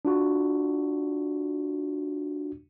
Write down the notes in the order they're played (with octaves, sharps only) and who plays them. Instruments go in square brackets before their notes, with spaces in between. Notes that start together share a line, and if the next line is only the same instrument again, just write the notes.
[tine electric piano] D4 F4 F#4